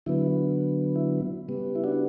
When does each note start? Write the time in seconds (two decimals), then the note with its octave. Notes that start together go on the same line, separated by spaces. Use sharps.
0.06 D3 F#3 B3 E4
0.96 E4
1.48 C#3 G3 B3
1.75 E4
1.84 D4 F#4